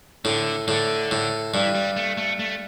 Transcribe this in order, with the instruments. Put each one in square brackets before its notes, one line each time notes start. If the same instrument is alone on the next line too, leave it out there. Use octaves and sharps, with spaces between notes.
[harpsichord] A2 [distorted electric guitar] D3
[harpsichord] A2 [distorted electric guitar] D3
[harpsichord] A2
[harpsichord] G2 [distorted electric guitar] E3
[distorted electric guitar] G3
A3
A3
A3